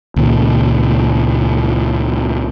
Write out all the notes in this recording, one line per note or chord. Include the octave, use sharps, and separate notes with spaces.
C#2 A#2 D#3